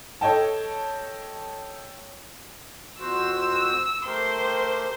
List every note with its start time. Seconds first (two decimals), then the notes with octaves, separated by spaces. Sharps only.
0.21 A4 C#5 D#5 G5 A5
3.00 F2 F#4 C5 E6
4.06 A3 G4 A#4 C5 C6